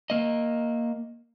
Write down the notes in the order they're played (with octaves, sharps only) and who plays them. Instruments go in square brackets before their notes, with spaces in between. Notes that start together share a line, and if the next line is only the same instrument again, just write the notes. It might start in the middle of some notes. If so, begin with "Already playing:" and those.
[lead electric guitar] A#3 D#5